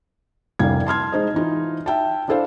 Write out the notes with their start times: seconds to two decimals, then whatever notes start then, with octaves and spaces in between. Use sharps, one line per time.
0.59 F1 C2 G3 D4 F5 G#6
0.87 A5 C6 F6 G#6
1.12 G#3 D#4 C5 D#5
1.34 E3 D#4 F4
1.86 E5 G5 A5
2.28 D4 E4 A4 C5 F5